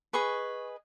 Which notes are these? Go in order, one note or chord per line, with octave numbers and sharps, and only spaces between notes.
G#4 B4 D#5 C#6